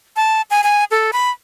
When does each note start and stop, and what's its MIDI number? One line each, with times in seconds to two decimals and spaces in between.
0.16 0.42 81
0.51 0.61 80
0.64 0.84 80
0.91 1.11 69
1.13 1.30 83